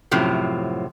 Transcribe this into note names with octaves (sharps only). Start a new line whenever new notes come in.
F#2 A2 C3 F3 F#3